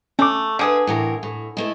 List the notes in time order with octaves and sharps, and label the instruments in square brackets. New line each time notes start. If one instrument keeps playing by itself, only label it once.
[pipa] A3 [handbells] C#4 D6
[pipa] D3 G#4 [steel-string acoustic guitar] B4 E5
[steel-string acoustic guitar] A2 E3 A#4
A2
G#3 A3 E4